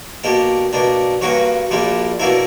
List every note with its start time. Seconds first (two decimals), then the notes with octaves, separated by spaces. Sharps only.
0.24 B2 A#3 D4 G4
0.73 B2 A#3 D4
1.21 G2 F#3 A#3 C#4 F#4
1.71 A#1 A#2 G3 A#3 D4
2.20 B2 F#3 A#3 D4 E4